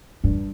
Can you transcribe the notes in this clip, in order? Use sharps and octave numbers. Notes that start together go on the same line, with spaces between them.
G2